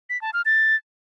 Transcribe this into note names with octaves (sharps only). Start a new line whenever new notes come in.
B6
A5
F6
A6